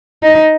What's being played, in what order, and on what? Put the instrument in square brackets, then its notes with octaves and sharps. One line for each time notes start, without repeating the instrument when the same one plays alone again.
[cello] D#4